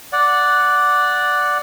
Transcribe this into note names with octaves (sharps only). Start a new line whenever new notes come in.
D5 F#5